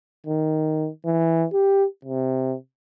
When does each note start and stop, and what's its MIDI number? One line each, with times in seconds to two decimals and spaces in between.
0.27 0.89 51
1.06 1.46 52
1.53 1.85 67
2.05 2.55 48